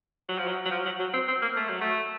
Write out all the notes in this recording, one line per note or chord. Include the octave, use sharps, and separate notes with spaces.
F#3
F3
F#3
F#3
F3
F#3
F#3
C4
C4
A#3
A3
F#3
A3